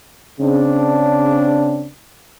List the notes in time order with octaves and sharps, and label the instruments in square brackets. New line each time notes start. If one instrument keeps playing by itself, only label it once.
[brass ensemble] C#3 C4 D4